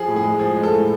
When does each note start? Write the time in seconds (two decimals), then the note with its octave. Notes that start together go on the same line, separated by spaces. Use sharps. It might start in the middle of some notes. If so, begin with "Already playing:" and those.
Already playing: F3 G#4
0.08 A2
0.16 G#4
0.24 G#3
0.39 F3 G#4
0.56 G#3
0.63 A4
0.72 A2